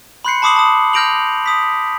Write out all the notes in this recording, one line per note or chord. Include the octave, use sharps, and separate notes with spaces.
B5 C6 F#6 G6 C7 C#7
A5 B5 D6 D#6 C7 F#7
A5 D#6
F6 G6 A#6 D7 F7 F#7
D#6 B6